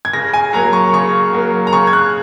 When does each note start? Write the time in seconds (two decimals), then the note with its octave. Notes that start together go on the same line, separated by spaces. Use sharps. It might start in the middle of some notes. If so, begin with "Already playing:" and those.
0.05 G#6
0.13 C#3 A#6
0.34 G#5
0.53 F#3 A#3 A#5
0.73 C#6
0.93 C#3 C#6
1.33 F#3 A#3
1.67 A#5
1.72 C#3 C#6
1.87 G#6
1.93 F#6